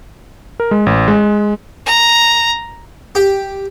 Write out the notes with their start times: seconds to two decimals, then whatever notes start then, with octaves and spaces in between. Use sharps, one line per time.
0.60 A#4
0.71 G#3
0.86 A1
1.08 G#3
1.86 A#5
3.15 G4